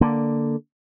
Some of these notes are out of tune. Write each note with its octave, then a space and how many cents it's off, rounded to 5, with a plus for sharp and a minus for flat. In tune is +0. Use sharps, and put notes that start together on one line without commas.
D3 +0 A#3 +0